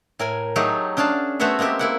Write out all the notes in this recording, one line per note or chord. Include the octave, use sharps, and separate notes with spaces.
A2 A#4 G#5
F#3 A3 D#4 G4 G#4
C#4 D4 G#4 F5 A5
A3 B3 F#4 C5 C#5 E5
G#3 A#3 C4 G4 E5
A#3 E4 F#5